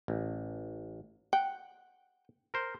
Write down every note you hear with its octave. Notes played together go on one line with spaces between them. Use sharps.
A1
F#5 G5
A#4 C5